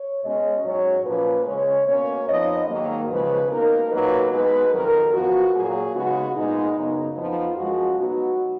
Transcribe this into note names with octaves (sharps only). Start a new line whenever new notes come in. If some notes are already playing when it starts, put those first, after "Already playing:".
Already playing: C#5
B2 G#3 C#4 D#5
G#2 F#3 C#4 C#5
A#2 F3 A#3 C#4 B4
C#3 G#3 C#4 C#5
B2 A#3 C#4 C#5
F2 F3 B3 D#4 D#5
G#2 D#3 F#3 A#3
D#2 C#3 F3 G#3 B4
B2 A#3 D#4 A#4
A#2 F#3 A#3 D#4 B4
B2 G#3 B3 D#4 B4
F2 D#3 F#3 A#4
F#2 F3 B3 F#4
A#2 F#3 A#3 G#4
C#3 G#3 B3 D#4 F#4
A#2 G#3 B3 D#4
F#2 C#3 F#3 B3 D#4
F2 F3 B3 D#4 F4
F#2 F3 G#3 C#4 F#4
B2 F#3 B3 D#4 F#4